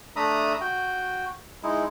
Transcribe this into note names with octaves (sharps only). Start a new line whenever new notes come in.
A3 D4 E5 A#5 B5 D#6
F#4 G5
G#3 D#4 E4